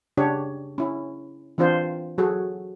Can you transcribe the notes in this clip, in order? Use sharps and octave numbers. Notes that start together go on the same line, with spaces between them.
C#3 D4 G4 C#5
C#4 E4
E3 C4 D4 F4 C5
F#3 F#4 G#4 A4